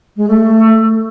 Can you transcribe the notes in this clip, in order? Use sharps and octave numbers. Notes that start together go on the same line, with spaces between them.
G#3
A3